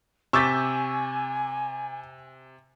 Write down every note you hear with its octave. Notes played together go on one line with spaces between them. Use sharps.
C3 G#5 C#6 D6 E6 G6 A6 B6